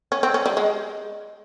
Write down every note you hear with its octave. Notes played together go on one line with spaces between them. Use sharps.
C#4
C4
C#4
G3
G#3